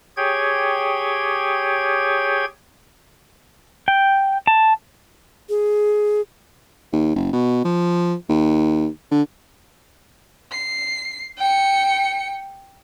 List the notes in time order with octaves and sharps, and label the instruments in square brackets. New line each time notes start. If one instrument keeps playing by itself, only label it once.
[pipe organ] G4 G#4 C#5 G5 G#6
[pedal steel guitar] G5
A5
[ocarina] G#4
[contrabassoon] D#2
F#1
B2
F3
D#2
D3
[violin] C7
G5 C#7